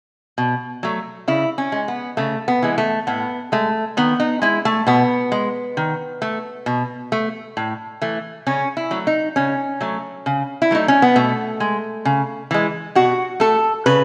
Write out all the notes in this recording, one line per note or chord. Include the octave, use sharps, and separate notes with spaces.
B2
F#3 A3
C#3 E4
C#4
G#3
B3
C#3 A3
B3
E3 G#3
A3
A2 B3
G#3 A3
D#3 B3
D#4
G#3 E4
A3
B2 B3
G#3
D#3
A3
B2
A3
A2
E3 A3
C#3 C#4
E4
F#3 A3
D#4
C#3 C#4
F#3 A3
C#3
E4
F#3 A3 D#4
C#4
B3
B2 A3
G#3
C#3
E3 G#3
B2 F#4
A3 A4
C#3 B4